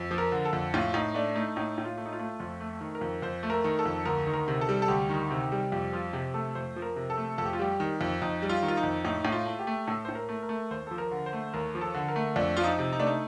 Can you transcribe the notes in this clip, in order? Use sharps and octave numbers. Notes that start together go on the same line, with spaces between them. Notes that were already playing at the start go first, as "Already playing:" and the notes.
Already playing: F2
F3
A#4
D3
A4
F2
A2 F4
A2 D#4
A3 D4
A3 D#4
A2 D#4
A2
F4
A3
D#4
F4
A3
F2 F4
A3
D#3
A#4
F2
F2 C5
A3
A#4
D#3
A4
F2
D2 A#4
D#3
A#4
C3
A4
G3
A4
D2 G4
D#3
C3
G3
F2 G4
F3 F4
C3 G4
A3 A4
F2 C5
F3
A#4
C3
A4
A3
F2 A4
G4
F4
G3 G4
D#3
F2
F2 D#4
G3
F4
D#3
F4
D#4
F2
A2 D#4
A2
F4
A3
G4
A3
A2 A4
A2 C5
A#4
A3
A#4
A3
D#2 C5
F3 A4
A#4
D3
C5
A3
D#2 A#4
F3
A4
D3
A#4
A3
F2 D4
F3 F4
D#4
C3
D#4
A3 D4
D#4